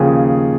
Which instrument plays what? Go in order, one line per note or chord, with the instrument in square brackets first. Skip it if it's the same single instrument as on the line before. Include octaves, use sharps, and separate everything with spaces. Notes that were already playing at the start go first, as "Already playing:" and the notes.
Already playing: [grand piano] D#2 C#3 F3 G#4